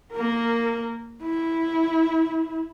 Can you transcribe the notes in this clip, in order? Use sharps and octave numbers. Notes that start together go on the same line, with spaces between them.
A#3 A#4
E4